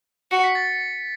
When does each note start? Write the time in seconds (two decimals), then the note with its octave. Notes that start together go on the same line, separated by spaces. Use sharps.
0.31 F#4 C#7
0.44 B6
0.55 A6